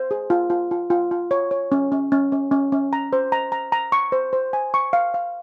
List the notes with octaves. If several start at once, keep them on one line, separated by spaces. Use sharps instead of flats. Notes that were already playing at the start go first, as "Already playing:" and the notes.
Already playing: C5
G#4
F4
F4
F4
F4
F4
C#5
C#5
C#4
C#4
C#4
C#4
C#4
C#4
A#5
C5
A#5
A#5
A#5
C#6
C5
C5
G#5
C#6
F5
F5